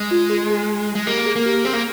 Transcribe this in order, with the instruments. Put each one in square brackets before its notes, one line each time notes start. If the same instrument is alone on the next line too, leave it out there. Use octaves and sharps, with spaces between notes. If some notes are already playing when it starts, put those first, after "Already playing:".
Already playing: [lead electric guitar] G#3
[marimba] F4
G#4
G#4
[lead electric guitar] G#3
[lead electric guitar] A#3 [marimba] G4
[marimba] G#4
[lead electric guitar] A#3
[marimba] G4
[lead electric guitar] C4 [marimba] G#4
[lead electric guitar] A#3